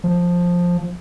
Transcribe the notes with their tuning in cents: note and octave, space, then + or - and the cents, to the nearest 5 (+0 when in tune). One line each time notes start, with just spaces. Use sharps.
F3 +10